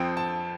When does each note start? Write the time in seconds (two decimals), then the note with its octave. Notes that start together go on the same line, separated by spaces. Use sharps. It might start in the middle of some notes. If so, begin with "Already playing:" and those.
Already playing: F2 F3 C4 G5
0.17 A5